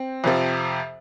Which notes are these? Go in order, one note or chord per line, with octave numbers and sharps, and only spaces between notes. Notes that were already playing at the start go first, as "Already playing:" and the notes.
Already playing: C4
F2 C3 F3